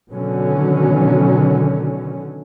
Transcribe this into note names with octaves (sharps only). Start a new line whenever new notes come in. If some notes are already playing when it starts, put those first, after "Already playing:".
B2 D3 D#3 F#3 C#4